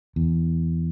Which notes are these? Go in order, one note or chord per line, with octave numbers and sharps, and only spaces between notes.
E2